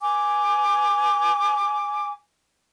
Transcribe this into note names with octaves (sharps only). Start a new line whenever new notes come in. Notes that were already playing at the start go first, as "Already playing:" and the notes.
G#5 D6